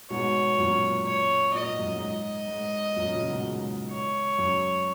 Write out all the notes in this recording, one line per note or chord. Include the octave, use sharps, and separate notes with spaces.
G#2 B2 C#5
F#2 A#2
C#5
A#2 D#5
G#2
F#2
G#2
D#5
G#2
F#2 A#2
A#2 C#3
G#2 B2
G#2
C#5
F#2